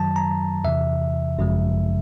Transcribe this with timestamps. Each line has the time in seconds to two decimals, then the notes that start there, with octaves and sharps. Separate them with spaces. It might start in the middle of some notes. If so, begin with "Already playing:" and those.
Already playing: F#2 D#3 F#3 A5
0.16 A#5
0.64 E2 C3 E3 E5
1.38 G#1 F#2 C#3 F3 G#3